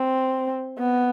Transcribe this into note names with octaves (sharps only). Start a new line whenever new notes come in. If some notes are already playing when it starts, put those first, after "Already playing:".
Already playing: C4
B3